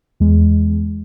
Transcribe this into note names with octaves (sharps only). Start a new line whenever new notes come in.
E2 G#3